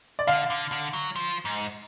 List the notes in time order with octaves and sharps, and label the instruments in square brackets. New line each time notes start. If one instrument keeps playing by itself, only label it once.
[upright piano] D5
[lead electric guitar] D3 [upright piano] F5
[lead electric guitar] D3
D3
F#3
F3
G#2